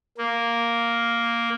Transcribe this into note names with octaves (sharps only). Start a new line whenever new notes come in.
A#3